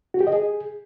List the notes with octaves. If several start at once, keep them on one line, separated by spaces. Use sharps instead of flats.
F#4
G4
D#5
G#4